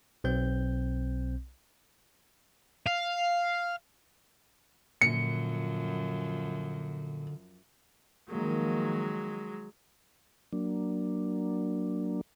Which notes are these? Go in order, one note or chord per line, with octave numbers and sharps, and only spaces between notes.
B1 C4 G6
F5
F#2 A#2 D3 F3 C#7
D#3 F3 F#3 G#3 A#3
F#3 A#3 D4